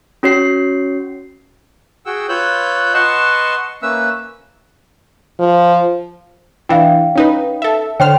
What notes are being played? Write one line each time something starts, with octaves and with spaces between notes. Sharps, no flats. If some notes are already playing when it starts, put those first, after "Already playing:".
C#4 F#4 C#5 C7
F#4 G#4 F#5 G5 E6
F4 B4 C#5 E6 F#6 G6
B4 D#5 F#5 A5 C6 C#6
A#3 C#4 B4 E5 E6
F3
E3 D4 E4 F5 G5
C#4 D#4 B4
A4 E5
D3 C5 C#5 G5 F6